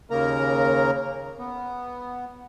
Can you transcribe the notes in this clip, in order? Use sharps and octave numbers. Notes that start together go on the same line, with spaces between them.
D#2 C#3 A#3 A#4 A#5
B3